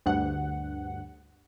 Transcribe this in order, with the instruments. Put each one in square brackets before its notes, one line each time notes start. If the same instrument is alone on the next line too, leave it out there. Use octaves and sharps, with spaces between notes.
[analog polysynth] D2 G2 F#5